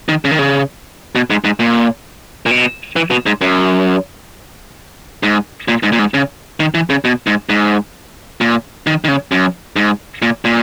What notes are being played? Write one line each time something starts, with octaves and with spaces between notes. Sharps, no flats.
D#3
C#3
D#3
C#3
B2
G#2
G#2
A#2
A#2
B2
E3
B2
G#2
F#2
G#2
A#2
G#2
A#2
G#2
C#3
D#3
E3
C#3
B2
G#2
G#2
A#2
D#3
D#3
C#3
F#2
G#2
A#2
A#2